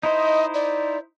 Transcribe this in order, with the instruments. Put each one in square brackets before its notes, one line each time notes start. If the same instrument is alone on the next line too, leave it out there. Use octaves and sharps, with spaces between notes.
[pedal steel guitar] D#4 E4 C5 [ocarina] D#5
[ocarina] D5